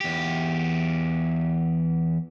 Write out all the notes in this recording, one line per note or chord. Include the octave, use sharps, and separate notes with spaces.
E2 G4